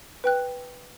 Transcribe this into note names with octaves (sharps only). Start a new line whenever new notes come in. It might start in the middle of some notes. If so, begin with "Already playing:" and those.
B4 G5 F#6